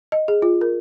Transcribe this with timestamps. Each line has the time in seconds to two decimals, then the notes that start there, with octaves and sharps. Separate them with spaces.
0.12 D#5
0.28 G#4
0.42 F4
0.61 A#4